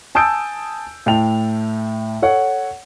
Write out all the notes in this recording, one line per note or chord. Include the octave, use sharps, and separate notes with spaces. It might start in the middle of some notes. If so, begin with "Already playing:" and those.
G#5 A5 D#6 E6 G6 D7
A2 G5 A5 F7
A4 C#5 F#5